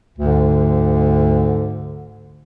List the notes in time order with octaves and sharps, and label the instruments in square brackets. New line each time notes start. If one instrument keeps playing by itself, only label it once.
[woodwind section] D2 G#2 D3